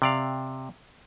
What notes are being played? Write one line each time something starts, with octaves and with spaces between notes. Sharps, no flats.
C3 D5 F5